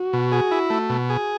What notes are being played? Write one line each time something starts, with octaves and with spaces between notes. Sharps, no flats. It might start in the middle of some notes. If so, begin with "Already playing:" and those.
Already playing: F#4
B2
G#4
E4
A3
B2
G#4